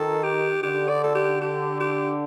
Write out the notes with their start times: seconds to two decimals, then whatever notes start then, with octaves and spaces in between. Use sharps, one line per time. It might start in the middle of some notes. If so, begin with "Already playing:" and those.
Already playing: D#3 A4
0.23 G4
0.63 D3 G4
0.89 D5
1.04 A4
1.15 G4
1.41 G4
1.80 G4